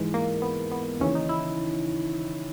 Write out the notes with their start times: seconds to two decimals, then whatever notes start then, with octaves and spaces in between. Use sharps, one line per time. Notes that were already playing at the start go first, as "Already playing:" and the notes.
Already playing: G#2 E3 G#3
0.14 A#3
0.42 B3
0.72 B3
1.00 D#2 C#3 E3 C#4
1.15 D#4
1.29 E4